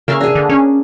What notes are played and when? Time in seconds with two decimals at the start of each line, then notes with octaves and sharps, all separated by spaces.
0.08 C#3 A#3 E5 F5
0.21 D4 G#4
0.35 D3
0.49 C#4